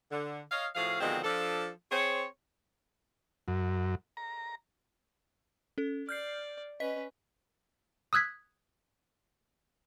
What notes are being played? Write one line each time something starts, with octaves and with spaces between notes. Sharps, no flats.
D3
C#5 D#5 F5
A2 F3 F#4 G#4 F5
B2 D3 D#3 F3 G#3 C4
F3 D4 A4
C4 G#4 C5 C#5
F#2
A#5
C#4 A4
D5 F6 G6 C7
C#4 B4 D#5 B6
D#6 E6 F#6 G#6 B6